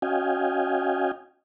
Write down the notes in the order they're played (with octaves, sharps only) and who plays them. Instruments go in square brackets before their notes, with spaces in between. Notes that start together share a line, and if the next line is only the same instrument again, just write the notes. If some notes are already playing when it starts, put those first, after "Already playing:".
[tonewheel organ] C#4 F#4 D#5 F5 G5 G#5